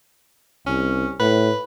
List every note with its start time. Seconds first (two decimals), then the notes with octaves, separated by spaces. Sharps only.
0.67 C2 C#4
1.20 A2 B4